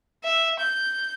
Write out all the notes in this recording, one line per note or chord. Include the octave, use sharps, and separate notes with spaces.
E5
G6